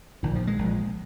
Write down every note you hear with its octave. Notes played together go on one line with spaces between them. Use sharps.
A#1 A#2 D#3
F3
G#3
A#1 A#2